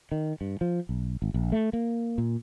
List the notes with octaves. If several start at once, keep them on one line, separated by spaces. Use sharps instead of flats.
D#3
G2
F3
B1
G#1
A#1
A3
A#3
A#2